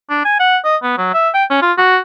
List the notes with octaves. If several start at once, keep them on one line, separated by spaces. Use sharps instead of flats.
D4
G#5
F#5
D#5
B3
F#3
E5
G5
C#4
F4
F#4